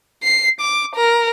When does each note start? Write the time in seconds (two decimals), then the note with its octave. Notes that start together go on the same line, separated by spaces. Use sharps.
0.24 C7
0.61 D6
0.96 A#4